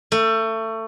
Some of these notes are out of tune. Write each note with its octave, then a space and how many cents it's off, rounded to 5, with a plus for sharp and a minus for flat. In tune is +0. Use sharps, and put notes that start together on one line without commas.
A3 +25